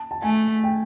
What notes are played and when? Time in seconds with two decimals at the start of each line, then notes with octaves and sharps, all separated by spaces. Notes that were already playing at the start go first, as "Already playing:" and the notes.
Already playing: A5
0.11 A5
0.22 A3 G#5
0.64 G5